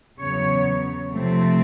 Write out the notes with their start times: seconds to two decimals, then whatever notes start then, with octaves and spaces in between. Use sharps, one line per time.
0.21 E2 C#3 F#3 B3 C#5
1.12 C3 F3 A3 C4